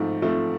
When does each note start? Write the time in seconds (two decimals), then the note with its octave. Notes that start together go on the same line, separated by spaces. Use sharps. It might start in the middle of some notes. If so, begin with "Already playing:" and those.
Already playing: G#2 F3 A3 C4
0.22 F3 A3 C4